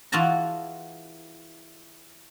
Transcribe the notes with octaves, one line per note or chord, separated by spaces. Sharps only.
E3 F4 F#4 G#4 A5 A#5